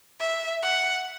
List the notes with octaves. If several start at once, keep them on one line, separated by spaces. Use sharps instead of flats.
E5
F#5